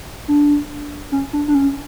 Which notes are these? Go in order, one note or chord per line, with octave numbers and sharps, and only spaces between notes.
D4
C#4
D4
D4
C#4